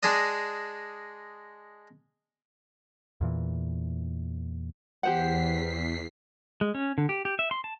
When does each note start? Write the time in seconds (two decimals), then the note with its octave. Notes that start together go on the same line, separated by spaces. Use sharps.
0.03 G#3 D4 D5 D#5
3.21 E2 A#2 E3
5.03 E2 G4 C5 F#5 B6 C7
6.61 G#3
6.75 C#4
6.98 D3
7.09 G4
7.25 G4
7.39 E5
7.51 C6
7.64 A5